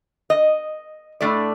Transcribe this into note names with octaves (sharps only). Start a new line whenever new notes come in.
D#5
A2 A3 D4 D5